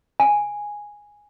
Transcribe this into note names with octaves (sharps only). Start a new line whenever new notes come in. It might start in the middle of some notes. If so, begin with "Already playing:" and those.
G#5